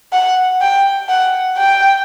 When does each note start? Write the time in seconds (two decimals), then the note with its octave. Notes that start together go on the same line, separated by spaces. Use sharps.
0.12 F#5
0.61 G5
1.09 F#5
1.57 G5